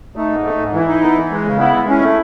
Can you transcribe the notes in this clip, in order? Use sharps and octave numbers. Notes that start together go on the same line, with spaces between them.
A3 D#4
G#2
A3
G#2
E3 E4
D#4
B3
E3
G#3
C#3
B3 E4
G#3
C#4 E4
A3